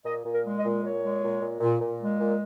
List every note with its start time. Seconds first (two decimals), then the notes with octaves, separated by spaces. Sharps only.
0.05 A#2 D#5
0.25 A#2
0.32 A#4
0.45 G#3
0.57 D#5
0.64 A#2
0.83 A#2 C#5
1.03 G#3
1.23 A#2
1.41 A#2
1.61 A#2
1.80 A#2
2.00 G#3
2.20 A#2